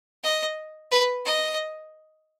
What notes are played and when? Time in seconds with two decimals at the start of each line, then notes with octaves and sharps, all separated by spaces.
0.24 D#5
0.91 B4
1.25 D#5